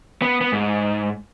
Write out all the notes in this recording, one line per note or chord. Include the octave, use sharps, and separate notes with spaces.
B3
B3
G#2